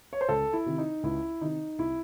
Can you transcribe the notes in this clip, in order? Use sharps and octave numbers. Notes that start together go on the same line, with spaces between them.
C#5
C5
C#2 A4
E4
C3 D#3
D#4
C#2 E4
C3 D#3 D#4
C2 E4